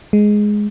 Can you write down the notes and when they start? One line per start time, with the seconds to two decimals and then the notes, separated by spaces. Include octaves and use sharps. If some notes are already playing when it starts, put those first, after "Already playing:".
0.13 G#3